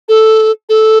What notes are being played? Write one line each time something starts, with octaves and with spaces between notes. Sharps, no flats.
A4
A4